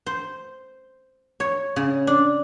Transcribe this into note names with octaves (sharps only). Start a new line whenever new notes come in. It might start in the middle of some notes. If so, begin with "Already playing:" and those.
C5
C#5
C#3
D4